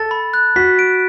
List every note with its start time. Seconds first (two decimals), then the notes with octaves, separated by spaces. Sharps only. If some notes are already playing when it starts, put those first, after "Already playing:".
Already playing: A4 A6
0.11 B5
0.34 F#6
0.56 F#4 B6
0.79 D7